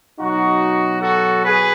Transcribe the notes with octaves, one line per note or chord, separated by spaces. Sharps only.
B2 F#3 D#4 F#4
F#4 A4
G#4 B4